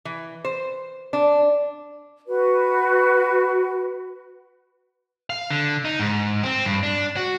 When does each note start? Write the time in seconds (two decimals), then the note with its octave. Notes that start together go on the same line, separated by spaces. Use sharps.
0.05 E3
0.45 C5
1.13 D4
2.27 F#4 B4
5.30 F5
5.50 D3
5.85 D#4
6.00 G#2
6.43 C4
6.65 G2
6.83 D4
7.17 F#4